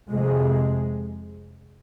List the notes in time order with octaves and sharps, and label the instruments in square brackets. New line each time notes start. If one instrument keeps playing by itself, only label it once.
[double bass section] F2 C3 G#3